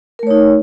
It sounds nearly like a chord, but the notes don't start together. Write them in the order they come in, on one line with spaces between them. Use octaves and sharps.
A#4 A3 C#5 D#4